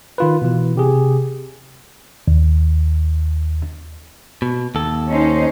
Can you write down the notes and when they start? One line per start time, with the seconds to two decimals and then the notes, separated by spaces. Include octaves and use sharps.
0.18 D#3 F4 B4
0.42 B2 E3
0.76 C3 G4 G#4
2.28 D#2
4.42 B2
4.75 D#2 A4
5.10 C#4 D#4 C5